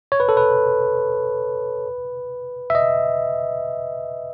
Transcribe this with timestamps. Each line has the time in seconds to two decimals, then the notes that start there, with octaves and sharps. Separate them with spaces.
0.12 C#5
0.20 B4
0.29 A4
0.37 B4
2.70 E5
2.75 D#5